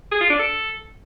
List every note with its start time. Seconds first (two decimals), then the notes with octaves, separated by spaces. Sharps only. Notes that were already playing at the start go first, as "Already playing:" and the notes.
0.11 G#4
0.21 F4
0.30 D4
0.39 A4